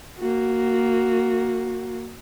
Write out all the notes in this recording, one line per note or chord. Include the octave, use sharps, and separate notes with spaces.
A#3 F#4